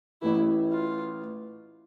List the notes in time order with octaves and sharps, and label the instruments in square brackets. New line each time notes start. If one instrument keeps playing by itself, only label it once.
[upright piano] A1 A2 E3 [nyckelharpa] E4
[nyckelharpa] F4